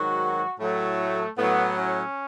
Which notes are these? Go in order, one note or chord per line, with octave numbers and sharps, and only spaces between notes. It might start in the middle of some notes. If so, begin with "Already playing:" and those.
Already playing: G#2 D#3 F#3 F#4
A2 F#3 A3
A2 F#3 B3
C#4